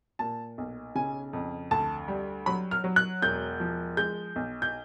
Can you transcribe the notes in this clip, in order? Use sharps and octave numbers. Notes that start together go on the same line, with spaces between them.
A#2 A5
B1
C#3 G#5
F2
D2 A5
G3
F#3 B5
F6
F#3
F#6
E1 G6
F3
G#3 G6
B1
G6